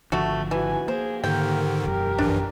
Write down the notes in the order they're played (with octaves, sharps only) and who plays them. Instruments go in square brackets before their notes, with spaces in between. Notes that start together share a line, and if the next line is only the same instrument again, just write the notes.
[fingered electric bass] G#1 D3 F3 [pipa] A3 F#4
[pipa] E3 [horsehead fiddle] F#4 G#5
[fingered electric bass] A#3 [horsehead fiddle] G#4 [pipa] C5
[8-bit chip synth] G#2 D3 D#3 [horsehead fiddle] G4 A#4 [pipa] G5
[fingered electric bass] E1 F#2 [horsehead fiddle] G4 A#4
[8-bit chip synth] A#1 G2 E3 [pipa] D4